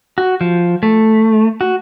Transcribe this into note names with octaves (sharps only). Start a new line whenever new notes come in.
F#4
F3
A3
F#4